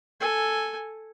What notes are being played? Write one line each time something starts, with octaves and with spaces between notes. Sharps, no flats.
A4 G#5